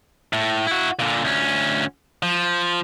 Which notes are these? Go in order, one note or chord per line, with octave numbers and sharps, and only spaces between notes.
A2
E4 F#4
A#2 D3
D2 C#4
F3